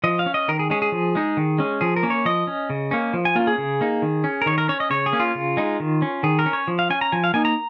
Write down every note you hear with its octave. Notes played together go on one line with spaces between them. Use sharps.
F3 D#5
F5
C#4
D#5
D#3 A#4
G#4
G#3 C#4 G#4
G#4
F3
G#3 D#4
D#3
G#3 C#4
F3 G#4
A#4
A#3 C#4
C#5
F3 D#5
C#4
C#3
A#3 C#4
F3
G#5
A#3 C#4 F4
G#4
C#3
A#3 D#4
D#3
C#4
A#4
D#3 C#5
A#4
C#4 C#5
D#5
C#3 C#5
G#4
A#3 C#4
F4
C#3
G#3 D#4
D#3
C#4
D#3 G#4
A#4
C#4
C#5
F3
F5
C#4 G#5
A#5
F3 G#5
F5
A#3 D#4 G#5
A#5